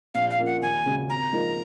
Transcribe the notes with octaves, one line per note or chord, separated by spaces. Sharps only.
A#1 F5
F5
A#2 F3 A#3 C#4
F#5
D#2 G#5
C#3 G#3 C#4 F#4
G#1 A#5
G#2 F3 A#3 D#4